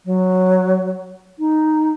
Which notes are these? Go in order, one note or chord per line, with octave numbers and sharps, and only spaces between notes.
F#3
D#4